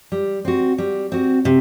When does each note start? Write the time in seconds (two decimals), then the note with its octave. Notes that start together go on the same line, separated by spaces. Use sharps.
0.12 G3
0.45 C4 F#4
0.78 G3
1.12 C4 F#4
1.45 C3